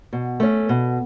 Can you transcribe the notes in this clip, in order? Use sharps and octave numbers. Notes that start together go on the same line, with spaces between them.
B2
A3 C#4
B2